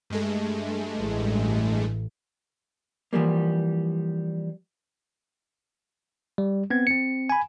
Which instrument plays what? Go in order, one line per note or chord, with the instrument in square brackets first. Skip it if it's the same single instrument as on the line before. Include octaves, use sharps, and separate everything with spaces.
[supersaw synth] G2 G#3 A3
[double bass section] A1
[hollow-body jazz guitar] E3 F3 G3 A#3
[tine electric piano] G3
B3 C4 G#6
C4 C#7
G#5 B5